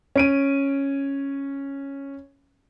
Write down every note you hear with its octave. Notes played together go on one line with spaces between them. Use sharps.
C#4 D7 D#7